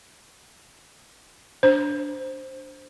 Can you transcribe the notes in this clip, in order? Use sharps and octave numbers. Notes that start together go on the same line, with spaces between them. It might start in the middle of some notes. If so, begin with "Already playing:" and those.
D4 C5